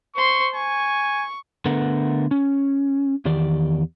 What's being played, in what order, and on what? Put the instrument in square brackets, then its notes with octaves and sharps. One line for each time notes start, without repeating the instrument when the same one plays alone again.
[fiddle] C5 C6 [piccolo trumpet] C#6
[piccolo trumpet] G#5 [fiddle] C#6
[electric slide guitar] D3 A3 B3 A#4 B4 F#5
C#4
E2 D#3 G4 D5